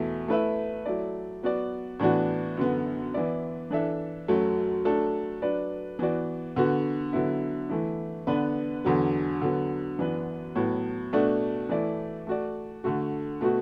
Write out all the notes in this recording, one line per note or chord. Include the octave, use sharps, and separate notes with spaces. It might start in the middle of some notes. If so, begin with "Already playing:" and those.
Already playing: E2 B2 A3 E4
A3 E4 B4 E5
F#3 A3 E4 D5
F#3 B3 F#4 D5
A2 E3 B3 D4 F#4
F#2 D3 B3
E3 B3 E4 D5
E3 D4 A4 E5
F#2 F#3 A3
F#3 A3 D4 A4
F#3 D4 B4 D5
E3 B3 F#4 D5
D3 B3 F#4
D3 F#3 B3 E4
E3 A3 E4
D3 B3 D4 B4
E2 D3 F#3
D3 F#3 B3
F#2 E3 B3 D4 B4
A2 F#3 B3
B2 A3 D4 F#4
E3 A3 E4 D5
A3 F#4 D5
D3 A3 F#4
B2 A3 F#4